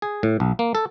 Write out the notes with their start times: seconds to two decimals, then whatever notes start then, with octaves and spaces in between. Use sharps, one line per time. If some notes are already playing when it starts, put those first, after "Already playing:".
0.02 G#4
0.23 A2
0.40 B1
0.59 A#3
0.75 A4